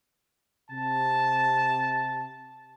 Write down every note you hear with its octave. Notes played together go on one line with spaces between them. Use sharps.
C3 A5